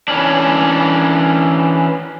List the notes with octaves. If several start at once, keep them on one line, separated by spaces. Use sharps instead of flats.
E3 C#4 D4